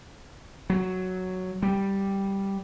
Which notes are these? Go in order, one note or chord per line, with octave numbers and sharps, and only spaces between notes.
F#3
G3